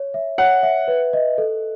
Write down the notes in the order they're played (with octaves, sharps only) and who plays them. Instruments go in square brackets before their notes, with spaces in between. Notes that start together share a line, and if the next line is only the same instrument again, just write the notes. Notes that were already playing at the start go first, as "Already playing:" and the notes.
Already playing: [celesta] C#5
E5
[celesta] C#5 [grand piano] F#5
[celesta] E5
B4
D#5
A4